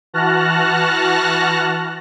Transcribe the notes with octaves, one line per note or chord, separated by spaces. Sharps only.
E3 F#4 A5 F6 F#6 A#6